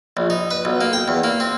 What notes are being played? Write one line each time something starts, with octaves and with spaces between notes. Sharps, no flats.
A#1
D#4
B4
B1
A#3
G5
E2
A#3
C4